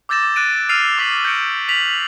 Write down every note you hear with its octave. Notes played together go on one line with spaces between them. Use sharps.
D6 E6 G6 A6 A#6 E7
F#6 A6 D7 D#7
E6 F6 A6 C7 D#7 F7
C#6 D6 B6 F#7
G6 A#6 C#7 D7
B6 F7 F#7